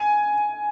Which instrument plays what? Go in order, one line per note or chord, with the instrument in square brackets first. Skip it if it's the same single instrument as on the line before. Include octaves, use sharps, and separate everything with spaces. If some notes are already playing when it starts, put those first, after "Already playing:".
Already playing: [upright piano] G#5